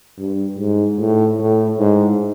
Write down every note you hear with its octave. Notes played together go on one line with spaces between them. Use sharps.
G2
G#2
A2
A2
G#2